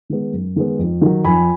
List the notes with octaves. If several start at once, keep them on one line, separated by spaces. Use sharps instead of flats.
D#3 G#3 B3
F#2
D#3 G#3 B3
F2
D#3 F#3
F2 G#5 B5